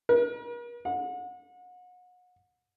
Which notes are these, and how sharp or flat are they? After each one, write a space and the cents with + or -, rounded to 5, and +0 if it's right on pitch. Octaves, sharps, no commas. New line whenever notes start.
A#4 +45
F#5 -35